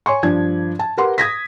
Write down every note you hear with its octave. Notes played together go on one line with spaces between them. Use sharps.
C#5 G#5 C6 C#6
G2 F3 D4 G#6
A5
G4 A#4 B4 F#5 C6
D#6 G#6 A#6 B6